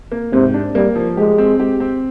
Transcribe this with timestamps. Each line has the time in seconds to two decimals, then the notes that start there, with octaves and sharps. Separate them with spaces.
0.12 A#3
0.32 G#2 C3
0.54 D4
0.75 G3 A#3
0.95 F3
1.17 G#3 G4
1.38 C4
1.60 G4
1.80 C4